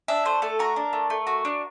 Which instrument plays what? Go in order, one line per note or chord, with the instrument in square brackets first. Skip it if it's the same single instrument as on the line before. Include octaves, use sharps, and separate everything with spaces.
[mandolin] D4 E5
A3 C5
A3 A4
F#4 A#4
D4
A3
A3
F#4
D4